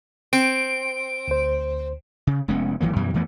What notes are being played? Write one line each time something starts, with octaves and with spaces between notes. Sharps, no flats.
C4 D7
D2 C5
C#3
F1 G#3 B3 C#4
G#1 E3 F#3 A#3
F#2 B2 E3 G3
F2 E3 A3 B3